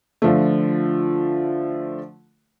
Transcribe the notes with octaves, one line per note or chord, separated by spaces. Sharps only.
D3 F3 A3